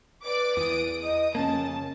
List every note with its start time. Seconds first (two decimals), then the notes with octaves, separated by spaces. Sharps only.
0.24 B4 D5 D6
0.57 E2 E3 D#6 D7
1.03 D#5 D#6
1.35 F2 C#3 A#3 C#4 A5